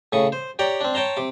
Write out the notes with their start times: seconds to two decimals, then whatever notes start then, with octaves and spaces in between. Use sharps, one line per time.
0.12 A2 C#3 C#6 D#6
0.32 C5
0.59 G4 C#5 D5 G5 A#5
0.81 C4 D4
0.94 C#5 G5 A5 A#5 C6
1.17 C3 D6